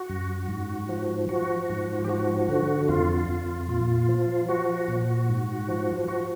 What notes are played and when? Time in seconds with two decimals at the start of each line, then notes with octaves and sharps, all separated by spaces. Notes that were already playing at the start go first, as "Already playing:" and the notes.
Already playing: F#4
0.10 F#2
0.49 G#2
0.89 F3
1.29 F3 F#4
1.69 G#2
2.04 G4
2.09 F3 F#4
2.49 D3
2.89 F2 F4
3.29 F2
3.68 A#2 F4
4.09 F3
4.49 F3 F#4
4.88 A#2
5.29 G#2
5.69 F3
6.08 F3 F#4